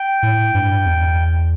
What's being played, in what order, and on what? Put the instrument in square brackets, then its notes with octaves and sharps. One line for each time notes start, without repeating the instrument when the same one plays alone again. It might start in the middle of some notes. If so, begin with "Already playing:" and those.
Already playing: [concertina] G5
[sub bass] A2
G2
E2